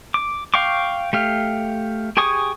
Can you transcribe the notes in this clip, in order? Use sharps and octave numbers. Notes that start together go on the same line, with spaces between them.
D6
F5 G5 C#6 D6
A3 G4 F5
G4 G#4 G#5 C#6 D#6